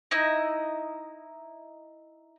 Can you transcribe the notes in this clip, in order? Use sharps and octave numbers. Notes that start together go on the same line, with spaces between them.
D#4 E4 D#5